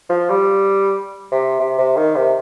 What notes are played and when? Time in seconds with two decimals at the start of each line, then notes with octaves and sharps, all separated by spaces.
0.10 F3
0.29 G3
1.32 C3
1.60 C3
1.79 C3
1.96 D#3
2.16 C3